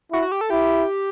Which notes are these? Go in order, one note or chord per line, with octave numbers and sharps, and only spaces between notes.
E4 F#4
F#4
G4
A4
E4 G4